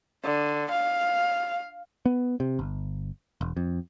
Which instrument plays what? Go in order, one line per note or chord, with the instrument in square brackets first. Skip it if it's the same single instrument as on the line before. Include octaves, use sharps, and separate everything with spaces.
[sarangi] D3
F5
[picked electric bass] B3
C3
G1
E1
F2